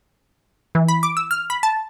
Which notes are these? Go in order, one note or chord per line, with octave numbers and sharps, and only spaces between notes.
E3
B5
D6
E6
F6
B5
A5